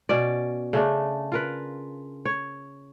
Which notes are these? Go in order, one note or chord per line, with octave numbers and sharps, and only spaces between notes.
B2 C#4 D5
C#3 A3 D4
F4 A#4 B4
C#5